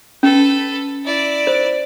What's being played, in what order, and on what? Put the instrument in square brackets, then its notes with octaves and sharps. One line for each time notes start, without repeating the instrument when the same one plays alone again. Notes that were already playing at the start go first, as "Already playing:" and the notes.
[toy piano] C#4 [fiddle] A4 B4
[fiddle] E4 D5
[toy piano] C5